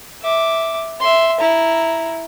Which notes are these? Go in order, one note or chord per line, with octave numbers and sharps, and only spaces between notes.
E5 D6
E5 C6
E4 A#5